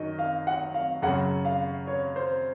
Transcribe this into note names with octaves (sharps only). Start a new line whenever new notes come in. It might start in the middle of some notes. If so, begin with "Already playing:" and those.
Already playing: F#2 D#3 F#3 D#5
F5
F#5
F5
F#2 C#3 F#3 F#5
F5
C#5
C5